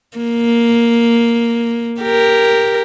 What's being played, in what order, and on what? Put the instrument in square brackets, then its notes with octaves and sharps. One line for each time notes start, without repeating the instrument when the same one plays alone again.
[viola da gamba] A#3
G4 A#4